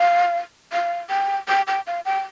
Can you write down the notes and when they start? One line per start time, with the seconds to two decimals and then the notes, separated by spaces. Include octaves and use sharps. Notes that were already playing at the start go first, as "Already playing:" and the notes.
Already playing: F5
0.73 F5
1.10 G5
1.49 G5
1.68 G5
1.87 F5
2.05 G5